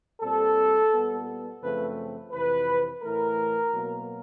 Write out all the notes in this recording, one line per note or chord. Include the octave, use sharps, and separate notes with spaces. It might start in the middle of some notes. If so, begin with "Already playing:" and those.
A#2 G3 C4 A4
A#2 G3 B3
F#2 C#3 F3 A3 C4 B4
F2 C3 E3 B4
A2 E3 A3 A#4
B2 F#3 A#3